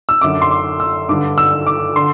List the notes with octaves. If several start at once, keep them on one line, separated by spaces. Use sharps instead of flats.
E6
F#2 D3 D6
C6
D6
E6
G2 D3 D6
E6
D6
D3 C6